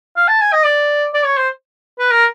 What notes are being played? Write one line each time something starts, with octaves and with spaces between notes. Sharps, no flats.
F5
A5
G#5
D#5
D5
D5
C#5
C5
B4
A#4